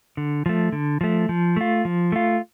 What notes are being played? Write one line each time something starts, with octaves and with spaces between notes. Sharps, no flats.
D3
F3 A3
D3
F3 A3
F3
A3 F4
F3
A3 F4